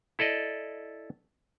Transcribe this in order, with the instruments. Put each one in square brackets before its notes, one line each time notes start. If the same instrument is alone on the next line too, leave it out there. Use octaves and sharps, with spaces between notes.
[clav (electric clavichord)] E4 A4 D5 D#5